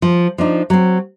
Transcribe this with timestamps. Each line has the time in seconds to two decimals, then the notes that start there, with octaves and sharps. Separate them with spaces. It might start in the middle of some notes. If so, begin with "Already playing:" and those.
0.02 F3
0.38 F3 D4 D#4
0.70 F#3 C4